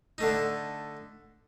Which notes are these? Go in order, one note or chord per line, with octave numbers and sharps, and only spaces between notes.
D3 A3 D#4